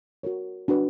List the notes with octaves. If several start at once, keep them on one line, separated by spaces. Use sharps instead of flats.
F#4 A#4 C#5
D4 F#4 B4